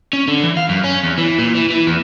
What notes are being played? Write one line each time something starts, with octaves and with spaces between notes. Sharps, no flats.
C#4
D3
E3
F5
F#2
C#4
E2
E3
A#2
E3
E3
E2